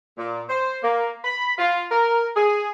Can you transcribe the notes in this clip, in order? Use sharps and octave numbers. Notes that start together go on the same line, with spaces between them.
A#2
C5
A#3
B5
F4
A#4
G#4